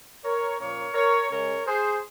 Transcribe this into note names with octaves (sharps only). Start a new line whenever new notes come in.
A#4 C#5
A#2 F3 A#3 C#4 A#4 C#5
A#4 C#5
C#3 G#3 C#4 A#4 C#5
G#4 C5